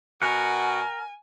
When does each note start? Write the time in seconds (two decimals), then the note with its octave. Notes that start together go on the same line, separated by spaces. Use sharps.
0.22 B2 F#4 A#4 F#5 G#5